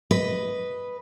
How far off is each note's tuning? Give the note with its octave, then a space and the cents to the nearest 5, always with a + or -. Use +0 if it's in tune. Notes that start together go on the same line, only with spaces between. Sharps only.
B4 +0 D#5 +0